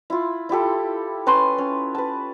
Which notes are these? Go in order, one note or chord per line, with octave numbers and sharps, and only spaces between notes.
E4 F4
E4 F4 G4 A4
C#4 B4 A5 C6
C#4
B4 A5